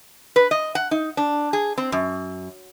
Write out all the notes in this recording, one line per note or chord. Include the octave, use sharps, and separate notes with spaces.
B4
D#5
F#5
D#4
D4
G#4
C4
F#2